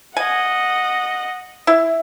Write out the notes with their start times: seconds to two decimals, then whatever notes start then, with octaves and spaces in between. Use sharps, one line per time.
0.17 D#5 F#5 G#5
1.67 E4